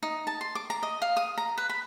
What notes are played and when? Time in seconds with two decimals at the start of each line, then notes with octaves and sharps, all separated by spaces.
0.03 D#4
0.27 A5
0.41 C6
0.55 D6
0.70 A#5
0.83 D#5
1.02 F5
1.17 D#6
1.38 A#5
1.58 B4
1.69 B5